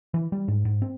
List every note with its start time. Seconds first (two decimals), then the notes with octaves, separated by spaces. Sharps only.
0.14 E3
0.32 G3
0.48 G#2
0.65 G#2
0.82 C4